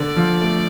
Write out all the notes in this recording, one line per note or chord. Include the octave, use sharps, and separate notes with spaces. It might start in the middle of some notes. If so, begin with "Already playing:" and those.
Already playing: D3 D5
F3
A3